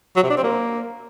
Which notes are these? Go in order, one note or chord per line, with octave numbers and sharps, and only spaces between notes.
F#3
C3
D4
C4
A#3